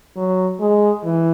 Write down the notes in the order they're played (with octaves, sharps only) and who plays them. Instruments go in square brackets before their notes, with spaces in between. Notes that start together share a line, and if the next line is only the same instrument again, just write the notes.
[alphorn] F#3
G#3
E3